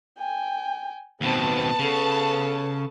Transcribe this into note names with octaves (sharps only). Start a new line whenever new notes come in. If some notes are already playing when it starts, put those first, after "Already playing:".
G5 G#5
D#2 B2 B3 C4 C5 A5
C#3 A4